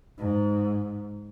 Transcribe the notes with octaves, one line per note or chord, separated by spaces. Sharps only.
G#2